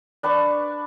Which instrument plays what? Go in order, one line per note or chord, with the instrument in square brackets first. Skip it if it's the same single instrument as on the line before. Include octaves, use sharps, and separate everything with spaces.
[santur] D4 B4 A5 C#6